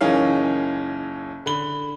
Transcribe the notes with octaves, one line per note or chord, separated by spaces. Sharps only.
F#1 E3 C#4 D#4 A#4 F5
D3 B5 G7